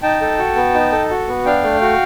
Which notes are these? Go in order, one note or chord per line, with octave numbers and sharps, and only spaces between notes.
D#4 G5 A5
A4
F#4
B3
D#4
A4
F#4
B3
D4 F5 G5
A3
F#4